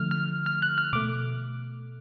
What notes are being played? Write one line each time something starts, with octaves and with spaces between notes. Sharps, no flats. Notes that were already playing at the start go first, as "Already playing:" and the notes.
Already playing: D3 F3 A3 F6
F6
F6
F#6
F6
B2 A3 D6